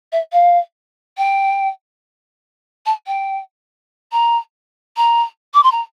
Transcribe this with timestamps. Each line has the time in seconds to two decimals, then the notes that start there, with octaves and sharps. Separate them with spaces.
0.12 E5
0.32 F5
1.17 G5
2.86 A5
3.07 G5
4.12 A#5
4.97 A#5
5.54 D6
5.63 C6
5.71 A#5